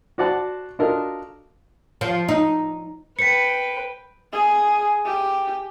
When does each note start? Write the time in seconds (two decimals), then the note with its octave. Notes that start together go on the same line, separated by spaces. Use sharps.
0.18 F#4 C5 D5 F#5 A5
0.79 D4 F4 F#4 A4 A#4 D#5
2.01 F3
2.29 D#4
3.19 B4 G5 B6 C#7
4.33 G#4
5.06 G4